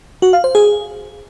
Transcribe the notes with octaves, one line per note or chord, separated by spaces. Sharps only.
F#4
F5
C5
G#4